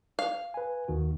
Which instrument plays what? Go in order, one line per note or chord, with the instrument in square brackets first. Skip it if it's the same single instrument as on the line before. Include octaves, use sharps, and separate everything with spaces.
[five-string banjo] F5
[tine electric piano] B4 G#5
D#2 D#3 F#4